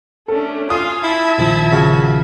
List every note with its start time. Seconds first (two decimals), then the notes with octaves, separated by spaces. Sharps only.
0.28 A3 C#4 D4 A4
0.70 F4 F5 G#5 C6 D#6
1.04 E4 E5 A5 G#6
1.38 A#1 D#3 F3 E4
1.72 C#3 F#4